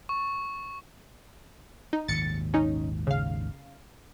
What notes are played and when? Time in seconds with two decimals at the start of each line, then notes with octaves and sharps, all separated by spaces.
0.09 C#6
1.93 D#4
2.08 G#1 D#2 A#2 A6 C#7
2.54 C#4 D#4
3.07 C#3 F5